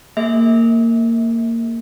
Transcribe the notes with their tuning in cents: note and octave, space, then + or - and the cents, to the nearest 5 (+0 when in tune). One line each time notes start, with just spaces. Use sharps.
A#3 -20 G#4 +0 E5 -35